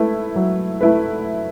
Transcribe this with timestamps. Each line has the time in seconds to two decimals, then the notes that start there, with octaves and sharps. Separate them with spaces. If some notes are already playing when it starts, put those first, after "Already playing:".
Already playing: A3 E4 B4
0.36 F#3
0.81 A3 E4 B4